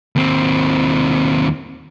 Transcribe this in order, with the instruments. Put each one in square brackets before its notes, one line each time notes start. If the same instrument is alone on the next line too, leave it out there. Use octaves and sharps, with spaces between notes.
[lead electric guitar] D#2 C4